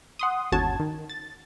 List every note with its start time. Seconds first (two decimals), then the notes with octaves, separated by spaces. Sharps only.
0.19 F#5 C6 D#6
0.52 G1 D#2 C#4 F#4 A5 G#6
0.80 D#3
1.09 A6